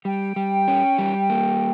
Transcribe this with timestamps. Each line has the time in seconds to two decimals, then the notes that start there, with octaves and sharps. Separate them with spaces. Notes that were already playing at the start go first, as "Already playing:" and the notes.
0.05 G3 G5
0.36 G3
0.68 C#4
0.98 G3
1.30 A#3